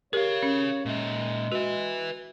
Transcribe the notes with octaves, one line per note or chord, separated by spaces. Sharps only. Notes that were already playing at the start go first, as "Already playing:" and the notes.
G4 G#4 A#4 C#5 F5
C#4
A#2 G#3 E5
F#4 B4 E5